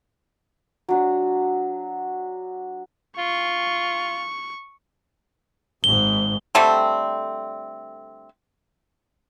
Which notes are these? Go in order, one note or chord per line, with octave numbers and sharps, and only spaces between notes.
F#3 D4
F4 C#6
G#1 G#2 G7
D3 G3 A3 C4